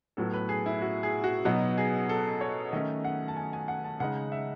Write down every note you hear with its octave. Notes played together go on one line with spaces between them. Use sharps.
A2 F#3 B3 A4
B4
G#4
E4
F#4
G#4
F#4
B2 F#3 B3 D#4 F#4
G#4
A4
C#5
D#3 A3 C#4 D#5
F#5
A5
G#5
G#5
F#5
A5
C#3 G#3 D#4 F#5
E5